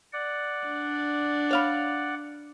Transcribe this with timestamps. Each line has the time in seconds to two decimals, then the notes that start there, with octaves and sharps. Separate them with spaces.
0.13 D5 F#5
0.66 D4
1.51 C#5 F5 B5